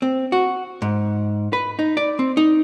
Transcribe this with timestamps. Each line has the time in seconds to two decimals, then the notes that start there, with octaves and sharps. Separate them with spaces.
0.02 C4
0.32 F#4
0.82 G#2
1.53 B4
1.79 D#4
1.97 D5
2.19 C4
2.37 D#4